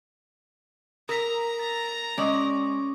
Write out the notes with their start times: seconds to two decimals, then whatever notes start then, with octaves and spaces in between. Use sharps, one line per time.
1.09 A#4 A#5 D#6 E6 B6
1.59 A6
2.18 G#3 C#4 D5 C#6 D#6